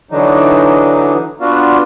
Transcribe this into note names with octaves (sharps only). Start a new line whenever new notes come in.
D3 E3 F#3 D4 D#4
B3 D4 F4 F#4